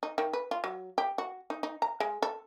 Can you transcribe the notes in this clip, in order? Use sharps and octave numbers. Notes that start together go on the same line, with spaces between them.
D#4
D#3
B4
F4
F#3
G4
F#4
D#4
D#4
A#5
G#3
A4